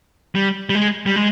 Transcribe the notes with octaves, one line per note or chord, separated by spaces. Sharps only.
G3
G3
G#3
G3
G#3